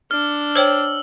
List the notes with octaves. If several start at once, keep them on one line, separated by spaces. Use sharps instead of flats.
D4 F6
C5 C#5 G5 E6